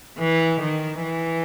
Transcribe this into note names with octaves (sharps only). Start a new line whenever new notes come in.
E3
D#3
E3